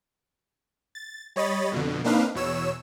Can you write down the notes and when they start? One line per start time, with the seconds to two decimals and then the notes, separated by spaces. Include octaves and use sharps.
0.95 A6
1.36 G3 C#5 D#5 B5 A6
1.72 F2 B2 D3
2.04 A#3 C4 D4 D#4 B4 F5
2.35 E2 B2 C#5 E6 E7